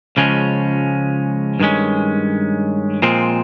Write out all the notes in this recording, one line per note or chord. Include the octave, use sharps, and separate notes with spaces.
C#2 C#3 F3 G#3 C#4
G2 D#3 G#3 C#4
A#2 F3 G#3 C4